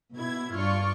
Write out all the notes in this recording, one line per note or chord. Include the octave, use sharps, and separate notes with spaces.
B2 E4 G#6
G2 D4 F4 D5 C#6